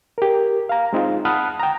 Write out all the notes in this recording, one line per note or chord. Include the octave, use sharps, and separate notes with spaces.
G4 A#4
F5 A#5
G#3 C4 D#4 F4
F#5 A5 B5 D#6 F6 F#6
G5 A#5